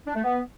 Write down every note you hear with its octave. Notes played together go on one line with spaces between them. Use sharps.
D4
A3
B3